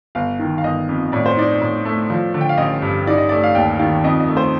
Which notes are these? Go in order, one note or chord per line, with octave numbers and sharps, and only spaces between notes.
G1 F5
D#3
F5
G1 D#5
F2
A2 D5
C5
D#4 D5
A2
A3
F3
D3
G5
F5
A1 D#5
G2
D#4 D5
D#5
A3 D5
F5
D#2 G5
D#3 F5
F2 D#5
D#5
A3
C5